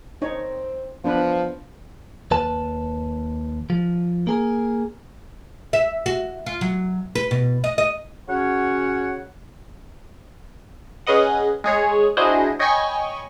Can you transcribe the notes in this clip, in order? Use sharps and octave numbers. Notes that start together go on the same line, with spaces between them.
C4 D#4 C#5
F3 B3 D4 B4
D#2 B4 A5
F3
A#3 G#4 A#4
E5
F#4
F4
F#3
B4
B2
D#5
D#5
C#3 C#4 F#4 C#5 F#5
C#4 G#4 B4 D#5 F#5
G#3 G#4 C#5
D4 E4 F#4 G#4 C5 D#5
C#5 D#5 G5 G#5 B5 C#6